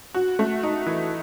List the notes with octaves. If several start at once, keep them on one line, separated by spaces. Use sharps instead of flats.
F#4
A3
D#4
E3